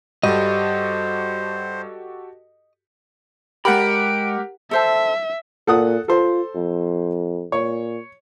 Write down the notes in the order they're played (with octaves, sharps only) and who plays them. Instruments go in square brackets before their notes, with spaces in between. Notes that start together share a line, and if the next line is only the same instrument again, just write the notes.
[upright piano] G2 [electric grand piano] F#4 G4 A4 [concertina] C5 [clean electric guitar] D#5
[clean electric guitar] G#3 B5 [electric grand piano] G4 A#4 F#5 [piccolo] D7
[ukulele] A4 C5 A5 [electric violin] E5
[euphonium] A#2 [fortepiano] A4 F#5 D#6
[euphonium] F4 [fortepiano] A4 C5
[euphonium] F2
[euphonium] A#2 [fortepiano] C#5